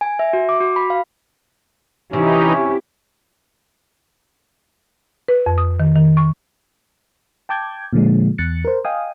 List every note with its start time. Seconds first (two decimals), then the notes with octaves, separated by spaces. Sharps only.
0.01 G#5
0.19 E5
0.33 F#4
0.49 D6
0.61 F#4
0.76 B5
0.90 F5
2.13 C3 E3 C#4 D#4 E4 G4
5.28 B4
5.46 F2
5.58 D#6
5.80 D#3
5.95 D#3
6.17 C#6
7.49 G5 A5 D6 G6 G#6
7.93 A#2 D3 F3 G#3
8.38 E2 F#6 A6 C#7
8.65 A#4 C5
8.85 D#5 F5 G5 G#5 D#6